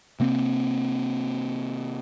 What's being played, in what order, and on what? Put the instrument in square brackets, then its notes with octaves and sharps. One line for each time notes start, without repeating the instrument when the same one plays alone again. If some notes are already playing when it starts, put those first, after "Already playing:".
[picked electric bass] C3 A#3 C4